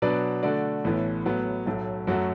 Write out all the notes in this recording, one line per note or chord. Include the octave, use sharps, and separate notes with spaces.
B2 F#3 D4 B4 D5
D3 A3 D4 F#4 D5
A1 A2 E3 B3
A2 F#3 B3
B1 A2 F#3 A3
F#2 F#3 A3 F#4